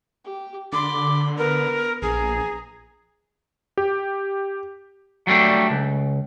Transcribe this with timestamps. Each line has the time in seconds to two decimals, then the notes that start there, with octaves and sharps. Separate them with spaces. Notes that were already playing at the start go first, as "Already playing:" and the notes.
0.24 G4
0.73 D3 B5 C6 D6
1.38 B3 A#4 B4
2.02 A#1 G#4 A#5
3.78 G4
5.27 F#3 G3 A3 D4
5.70 C#2